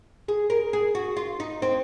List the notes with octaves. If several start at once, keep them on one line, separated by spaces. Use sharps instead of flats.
G#4
A#4
G#4
F#4
F4
D#4
C4